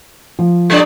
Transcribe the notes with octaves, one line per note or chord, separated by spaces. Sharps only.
F3
G3 D4 D5